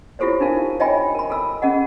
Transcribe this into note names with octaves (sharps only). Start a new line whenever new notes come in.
E4 F4 G4 A4 C5 C#5
D4 D#4 A#4 F5
C#5 D#5 E5 G5 G#5 B5
A#4 B5
A4 E6
C#4 G#4 D#5 F#5